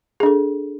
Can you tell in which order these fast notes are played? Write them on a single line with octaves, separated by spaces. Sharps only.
G#4 D4 A4